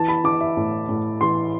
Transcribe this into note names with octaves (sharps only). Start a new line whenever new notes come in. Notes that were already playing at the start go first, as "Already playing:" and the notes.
Already playing: E3 A5
B5
E3 D6
E5
A2
A2
E3 C6